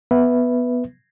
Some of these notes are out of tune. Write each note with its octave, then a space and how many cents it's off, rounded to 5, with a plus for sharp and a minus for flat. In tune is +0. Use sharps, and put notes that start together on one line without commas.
B3 +0 B4 +0 E5 +0